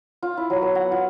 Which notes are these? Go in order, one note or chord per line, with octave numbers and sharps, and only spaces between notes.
F4
E4
F#3
B3
F#5
F4